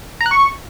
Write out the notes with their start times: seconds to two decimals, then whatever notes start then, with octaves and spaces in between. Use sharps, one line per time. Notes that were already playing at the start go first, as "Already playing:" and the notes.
0.21 A#5
0.26 F#6
0.31 C#6